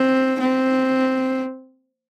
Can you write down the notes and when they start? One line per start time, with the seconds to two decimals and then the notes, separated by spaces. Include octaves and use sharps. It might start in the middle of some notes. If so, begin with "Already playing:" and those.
Already playing: C4
0.40 C4